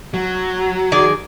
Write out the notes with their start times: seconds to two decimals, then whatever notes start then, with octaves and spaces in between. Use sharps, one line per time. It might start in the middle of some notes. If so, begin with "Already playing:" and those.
0.14 F#3
0.92 D#3 G#4 D5